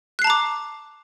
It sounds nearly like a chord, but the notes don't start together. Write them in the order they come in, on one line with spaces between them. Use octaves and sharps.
F#6 C7 A5 A#5 D6